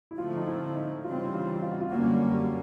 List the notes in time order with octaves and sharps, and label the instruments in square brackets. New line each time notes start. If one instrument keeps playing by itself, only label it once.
[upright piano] E4
[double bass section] D3 F3 A3 C4 [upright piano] F4
[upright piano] D#4
E4
D#4
[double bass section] C#3 E3 G3 C4 [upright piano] F4
[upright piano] F4
F4
F#4
F4
[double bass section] F#2 D3 G3 A#3 C#4 [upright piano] F#4
[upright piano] F#4
G4